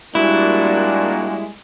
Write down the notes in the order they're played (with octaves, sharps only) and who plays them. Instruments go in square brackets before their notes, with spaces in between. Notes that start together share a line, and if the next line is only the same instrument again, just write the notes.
[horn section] A#2 D4 F#4 [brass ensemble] G3 G#3 A#3 [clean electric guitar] E4